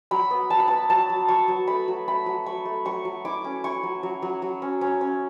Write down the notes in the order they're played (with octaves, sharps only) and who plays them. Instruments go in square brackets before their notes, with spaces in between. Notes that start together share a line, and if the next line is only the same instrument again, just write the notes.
[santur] F#3 B5
B3
F#3 A5
B5
B3 A5
F#3 A5
F#3
F#3 C#6
F#3
A3 B5
F#3
A3 B5
F#3
F#3 C#6
A3
F#3 C#6
F#3
E4 D6
C#4
E4 C#6
F#3
F#3
F#3
F#3
C#4
C#4
C#4